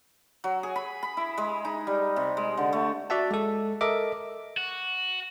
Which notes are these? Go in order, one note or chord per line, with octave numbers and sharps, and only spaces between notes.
F#3
G#4
B5
B5
E4
G#3
D#4
G3
C3
G#3
D3
A3
F#4 D5 E5 F#5 A5
G#3 A4
A4 A#4 D#5 E5 D6
F#4